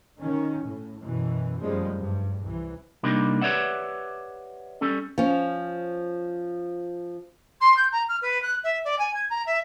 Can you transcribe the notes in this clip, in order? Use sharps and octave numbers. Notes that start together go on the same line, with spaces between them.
D#3 C#4
A2
F#2 B2 E3
F1 F#2 F3 G3 G#3
G2
C2 E3
C3 G3 A#3 D4 D#4
G4 B4 C#5 D5 E5 F#5
G3 C#4 A4
F3 C#4
C6
G6
A#5
F6
B4
F#6
E5
D5
G#5
G#6
A#5
E5